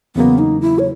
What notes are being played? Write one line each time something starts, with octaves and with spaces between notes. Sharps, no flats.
E2 C#3 F#3 A#3 B3
D#4
E4
C#5